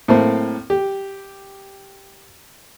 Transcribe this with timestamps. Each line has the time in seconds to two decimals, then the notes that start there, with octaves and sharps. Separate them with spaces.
0.08 A2 A3 A#3 C4
0.70 G4